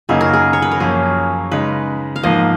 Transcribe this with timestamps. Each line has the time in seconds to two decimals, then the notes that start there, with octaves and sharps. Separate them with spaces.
0.09 F#2 C#3 F#3 A#3 D#4 G#4
0.21 A#4
0.33 G#4
0.53 C#5
0.62 B4
0.71 A#4
0.80 F#2 F3 A#3 C#4 G#4
1.51 C#3 G#3 D#4 B4
2.16 F5
2.23 G#2 F3 A#3 D#5